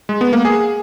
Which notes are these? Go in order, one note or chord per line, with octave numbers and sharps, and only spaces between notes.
G#3
B3
A#3
G#4